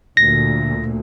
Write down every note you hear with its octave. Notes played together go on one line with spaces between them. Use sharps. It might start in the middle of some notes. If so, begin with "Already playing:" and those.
D2 A#2 A#6